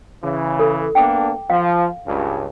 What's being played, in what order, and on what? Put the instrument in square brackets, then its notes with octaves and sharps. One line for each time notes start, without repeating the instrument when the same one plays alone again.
[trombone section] C#3 E3
[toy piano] A4
[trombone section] A#3 B3 D4 [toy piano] G5 D6
[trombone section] F3 [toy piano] F5
[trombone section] C#2 G2